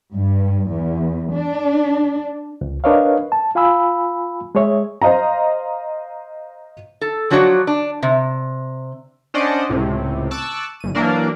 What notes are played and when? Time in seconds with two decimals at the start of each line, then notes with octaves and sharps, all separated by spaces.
0.15 G2
0.69 E2
1.33 D4
2.61 C#2
2.84 D4 A#4 B4 C#5 D#5 F5
3.32 A5
3.55 F4 F5 G#5 B5 E6
4.55 G#3 G#4 C#5 E5
5.02 C5 D#5 F5 A#5
7.01 A4
7.30 F3 F#3 D4 F#4 C#5 D5
7.67 D4
8.03 C3
9.34 C#4 D4 C5 D5 D#5 F#5
9.69 C#2 A2 C3
10.31 A5 C#6 D6 E6 F#6 A6
10.80 G1 D#7
10.95 E3 F#3 A#3 D4 A#4 D5